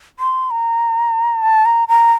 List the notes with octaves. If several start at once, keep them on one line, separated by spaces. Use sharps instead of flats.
C6
A#5
A5
A#5
A#5